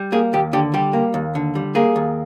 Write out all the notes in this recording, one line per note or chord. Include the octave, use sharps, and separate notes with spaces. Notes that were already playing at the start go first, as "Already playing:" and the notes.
Already playing: G3
A#3 G#4
D#2 G4
D3 G4
G3 G4
A#3
D#2
D3
G3
A#3 G#4
D#2